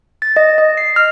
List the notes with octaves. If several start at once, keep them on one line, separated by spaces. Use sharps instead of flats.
A6
D#5
D#5
C7
F6